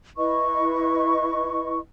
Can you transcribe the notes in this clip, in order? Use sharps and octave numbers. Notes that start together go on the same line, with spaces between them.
E4 B4 D#5 C#6